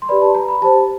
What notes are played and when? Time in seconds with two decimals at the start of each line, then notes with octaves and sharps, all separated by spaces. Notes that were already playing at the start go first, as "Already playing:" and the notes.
0.02 C6
0.09 G4 B4 D5 B5
0.22 A5
0.35 A#5
0.48 B5
0.62 G4 C5 A5